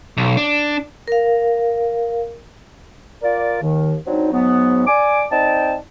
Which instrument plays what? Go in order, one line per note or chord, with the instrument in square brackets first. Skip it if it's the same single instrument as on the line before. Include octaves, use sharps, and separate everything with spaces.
[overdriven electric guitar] B1
D4
[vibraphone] A#4 F5
[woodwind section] F4 A#4 D5
D#2 D#3
F#3 C4 D4 D#4
G#2 F#3 B3
D5 G#5 D6
C4 D#4 D5 G5 A5